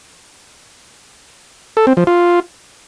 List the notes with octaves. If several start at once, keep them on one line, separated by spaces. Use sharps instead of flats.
A4
C4
F3
F4